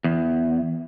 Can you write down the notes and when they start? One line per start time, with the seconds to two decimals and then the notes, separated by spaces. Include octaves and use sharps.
0.04 E2